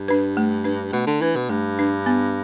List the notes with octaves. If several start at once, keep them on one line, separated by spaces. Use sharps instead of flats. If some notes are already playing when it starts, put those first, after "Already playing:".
Already playing: G2
D4 B4
A3
D4 B4
B2 A3
D3
E3 D4 B4
B2
G2 A3
D4 B4
B3